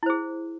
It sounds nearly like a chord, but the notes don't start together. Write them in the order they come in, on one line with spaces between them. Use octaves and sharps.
E4 C5 G#4